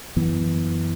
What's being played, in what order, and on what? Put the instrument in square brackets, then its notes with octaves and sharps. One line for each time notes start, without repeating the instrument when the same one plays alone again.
[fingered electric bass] F#2 E3 B3